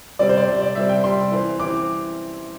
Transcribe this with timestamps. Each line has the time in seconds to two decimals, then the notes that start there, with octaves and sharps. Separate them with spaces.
0.19 C3 G3 C4 D5
0.29 C5
0.38 D5
0.47 C3 G3 C4
0.62 D5
0.75 C3 G3 C4 E5
0.89 G5
1.04 C3 G3 C4 C6
1.31 E3 C4
1.60 E3 C4 D6